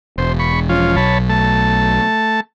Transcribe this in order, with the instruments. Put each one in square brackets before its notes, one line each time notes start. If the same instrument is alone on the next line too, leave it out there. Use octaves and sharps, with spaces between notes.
[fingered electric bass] E1 [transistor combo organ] C5
[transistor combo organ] B5 C#6
F3 C#4 F4
[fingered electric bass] B1 [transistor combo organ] C#5 A5 B5
[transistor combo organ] A3 A5